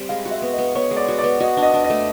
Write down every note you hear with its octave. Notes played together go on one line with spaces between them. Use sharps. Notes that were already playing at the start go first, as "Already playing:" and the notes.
Already playing: G3 C4
G#3 F5
F#4
E5
B3
D#5
B3
B3 C#5
G#3
D5
F#4
D5
B3
F#4 D#5
D4
D#5
D4
D#5
A3